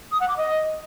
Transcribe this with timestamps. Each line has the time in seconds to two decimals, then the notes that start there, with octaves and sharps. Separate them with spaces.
0.11 D#6
0.20 F#5
0.28 D6
0.37 D#5